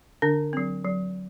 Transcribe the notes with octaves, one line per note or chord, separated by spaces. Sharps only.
D3 D4
F#3 C4
F#3